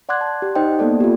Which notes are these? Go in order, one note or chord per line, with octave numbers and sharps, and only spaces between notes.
D5 F#5 C6 D6 F#6 G#6
A5
G4
D#4 C5 D#5 G5
A#3 B3 A4 D5
F4 G4